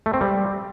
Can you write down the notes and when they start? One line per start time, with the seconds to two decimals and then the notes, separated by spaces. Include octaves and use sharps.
0.06 A3
0.14 C4
0.21 G3